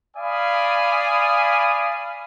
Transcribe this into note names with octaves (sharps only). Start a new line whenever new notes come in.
D5 F5 G#5 B5 D#6